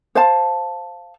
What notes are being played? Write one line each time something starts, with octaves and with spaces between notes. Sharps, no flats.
C5 F5 A5